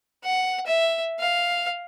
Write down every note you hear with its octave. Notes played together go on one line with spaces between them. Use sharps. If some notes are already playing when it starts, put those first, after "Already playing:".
F#5
E5
F5